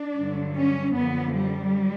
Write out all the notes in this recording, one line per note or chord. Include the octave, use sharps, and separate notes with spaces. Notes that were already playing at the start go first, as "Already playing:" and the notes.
Already playing: D4
G2 D3 F#3
C#4
F#2 D3 F3 B3
G3